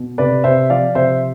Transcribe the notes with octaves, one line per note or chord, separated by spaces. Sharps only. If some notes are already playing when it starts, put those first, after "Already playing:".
Already playing: B2
C3 B4 D5
C3 C5 E5
F3 D5 F5
C3 C5 E5